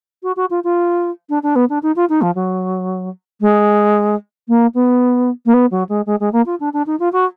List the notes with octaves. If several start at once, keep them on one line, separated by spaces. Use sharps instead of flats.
F#4
F#4
F4
F4
D4
D4
B3
D4
D#4
F4
D#4
F3
F#3
G#3
A#3
B3
A#3
B3
F#3
G#3
G#3
G#3
A#3
F4
D4
D4
D#4
F4
F#4